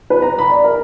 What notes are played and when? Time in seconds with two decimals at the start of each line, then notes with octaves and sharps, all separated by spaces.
0.10 B4
0.22 A#5
0.39 B5
0.51 D5
0.64 A#4